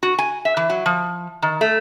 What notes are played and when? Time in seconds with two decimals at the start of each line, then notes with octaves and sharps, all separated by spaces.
0.03 F#4
0.19 G#5
0.45 E5
0.57 E3
0.70 F#3
0.86 F3
1.42 D#3
1.61 A3